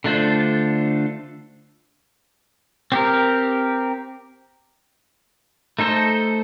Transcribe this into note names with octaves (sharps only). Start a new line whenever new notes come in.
D3 A3 D4 F4 C5
C4 G4 A#4
A3 D#4 A4 C5